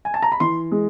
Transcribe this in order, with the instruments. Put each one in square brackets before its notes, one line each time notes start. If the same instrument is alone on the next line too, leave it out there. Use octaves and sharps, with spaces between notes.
[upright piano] G#5
A5
A#5
B5
E3 C6
G#3